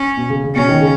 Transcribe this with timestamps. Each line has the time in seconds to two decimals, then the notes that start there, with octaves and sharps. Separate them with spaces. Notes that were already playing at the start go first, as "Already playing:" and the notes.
Already playing: C#4
0.17 B2
0.30 C#3
0.44 C#3
0.56 B2 C#4
0.69 D#3
0.81 C#3